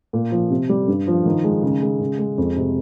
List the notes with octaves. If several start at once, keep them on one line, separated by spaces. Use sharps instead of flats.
A#2
F3
C3
G3
G2
F3
D#3
G#3
C#3
G#3
C#3
G#3
F2
C3